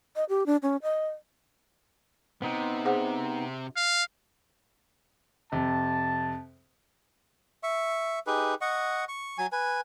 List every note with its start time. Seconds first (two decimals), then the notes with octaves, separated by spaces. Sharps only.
0.16 D#5
0.29 G4
0.46 D4
0.62 C#4
0.83 D#5
2.42 C3 B3 D#4
2.85 G#4 C5 F#5
3.77 F5
5.52 F2 C3 A5
7.63 E5 C#6
8.27 D#4 G4 G#4 B4
8.61 D#5 F#5 C#6
9.08 C#6
9.38 F#3 G#5
9.52 B4 G#5